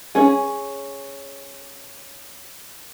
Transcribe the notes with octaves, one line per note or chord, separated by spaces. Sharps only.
C#4 G#4